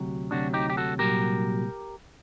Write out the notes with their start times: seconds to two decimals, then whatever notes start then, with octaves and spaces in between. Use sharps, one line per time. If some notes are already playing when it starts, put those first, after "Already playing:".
Already playing: D2 C3 F#3
0.31 D2 C3 D#3 F#3 D4 F#4
0.54 D#4 G4
0.70 G4
0.77 F#4 A4
0.99 C2 A#2 F#3 G4 A#4